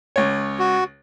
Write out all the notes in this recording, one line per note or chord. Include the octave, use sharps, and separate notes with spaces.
C#2 C#5
F#4